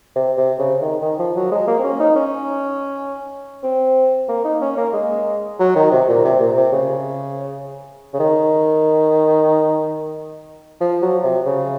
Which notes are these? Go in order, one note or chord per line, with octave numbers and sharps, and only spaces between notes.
C3
C3
C#3
D#3
D#3
F3
F#3
G#3
A#3
C4
C#4
D#4
C#4
C4
A#3
D#4
C#4
A#3
G#3
F#3
D#3
C3
A#2
C3
A#2
C3
C#3
C#3
D#3
F3
F#3
C3
C#3